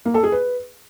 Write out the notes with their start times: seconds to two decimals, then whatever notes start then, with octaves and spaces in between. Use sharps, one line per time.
0.05 A#3
0.14 A4
0.23 G#4
0.32 B4